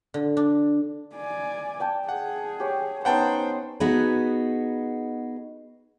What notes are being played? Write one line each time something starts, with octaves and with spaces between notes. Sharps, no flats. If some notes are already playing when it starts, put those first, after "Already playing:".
D3
D4
D5 G#5
D5 G5 A5
G#4 F#5
G4 C#5
B3 C#4 D#4 C5 F#5 G5 A5
B3 D#4 F#4 G#4 B4